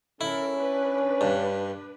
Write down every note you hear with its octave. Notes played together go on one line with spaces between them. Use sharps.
C#4 E4 A4 A#4
D4 B4
G2